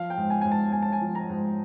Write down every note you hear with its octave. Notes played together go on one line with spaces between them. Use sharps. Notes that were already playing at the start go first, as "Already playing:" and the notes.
Already playing: F3 F5
G5
G#2
G#5
G#2 G#5
A5
G#2 G#5
A5
G#5
F3
A#5
G#2